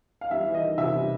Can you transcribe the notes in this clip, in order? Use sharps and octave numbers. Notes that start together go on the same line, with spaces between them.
F5
G3 E5
E2
D#5
D#3
C3 E5
G3